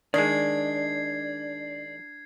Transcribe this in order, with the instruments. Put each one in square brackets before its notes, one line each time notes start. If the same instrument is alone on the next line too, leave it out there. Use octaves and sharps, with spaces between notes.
[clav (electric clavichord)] D#3 G#3 [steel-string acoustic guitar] D4 [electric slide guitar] D5 [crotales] G#6 C7